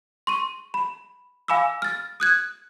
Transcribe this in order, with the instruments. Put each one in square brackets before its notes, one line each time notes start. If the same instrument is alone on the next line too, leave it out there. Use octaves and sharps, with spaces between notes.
[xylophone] C6 C#6 D#7
B5
F5 G#5 B5 D6 E6
F6 A6
D#6 F#6 G#6